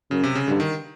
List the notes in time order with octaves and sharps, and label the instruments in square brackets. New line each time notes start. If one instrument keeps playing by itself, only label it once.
[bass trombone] F#2 [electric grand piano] C#3
[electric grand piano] C3
C#3
[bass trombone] G2 [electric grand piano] D3
[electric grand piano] D#3